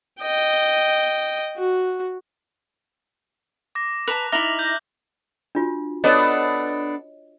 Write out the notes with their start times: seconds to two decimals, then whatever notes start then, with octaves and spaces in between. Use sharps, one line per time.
0.22 D#5 G5
1.57 F#4
3.75 D6 A#6
4.08 B4 A5 A#5 F#6 F7
4.32 D#4 E4 E5 D6 F6 A#6 F7 F#7
4.59 G6
5.55 D4 F4 F#4
6.04 B3 D4 A4 C#5 D#5